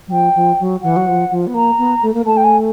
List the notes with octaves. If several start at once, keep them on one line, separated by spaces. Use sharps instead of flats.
F#3
F3 G5
F3
F#3
E3 F#5
F#3
F3
F3
B3
A#3 A#5
B3
A3
A#3
A3 A5
G5
G#5